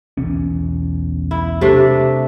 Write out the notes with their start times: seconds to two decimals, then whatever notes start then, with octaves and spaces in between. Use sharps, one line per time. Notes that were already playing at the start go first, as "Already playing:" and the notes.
0.17 B1 E2 C#4
1.31 E4
1.61 C3 A3 D4